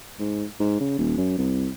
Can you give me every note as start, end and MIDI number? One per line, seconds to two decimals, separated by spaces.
0.19 0.44 44
0.60 0.78 44
0.80 0.94 49
0.98 1.14 27
1.17 1.35 42
1.38 1.69 36